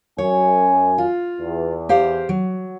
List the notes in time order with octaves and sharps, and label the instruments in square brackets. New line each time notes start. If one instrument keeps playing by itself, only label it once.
[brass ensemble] F#2 G#5 [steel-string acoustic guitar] C#5
[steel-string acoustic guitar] F4
[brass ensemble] E2
[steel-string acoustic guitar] G4 C5 F5
F#3